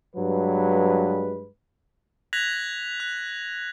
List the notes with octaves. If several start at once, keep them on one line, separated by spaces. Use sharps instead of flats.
G2 F#3 G#3 B4
F#6 G#6 A#6 B6 F7 F#7
F#6